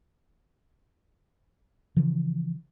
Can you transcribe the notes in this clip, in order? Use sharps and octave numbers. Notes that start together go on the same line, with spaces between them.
C#3 E3 F3